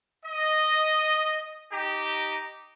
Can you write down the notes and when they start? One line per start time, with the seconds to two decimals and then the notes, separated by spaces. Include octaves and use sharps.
0.25 D#5
1.71 D#4 G4